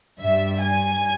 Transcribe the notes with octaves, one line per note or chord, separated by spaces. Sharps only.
G2 G3 E5
G#5